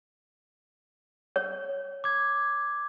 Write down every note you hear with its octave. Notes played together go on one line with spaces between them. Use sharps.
C#5
D6 G#6